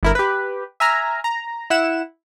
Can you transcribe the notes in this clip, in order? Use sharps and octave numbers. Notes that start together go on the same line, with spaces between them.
G1 E4 A#4
G4 B4
E5 G#5 A#5 F6
A#5
E4 F#5 E7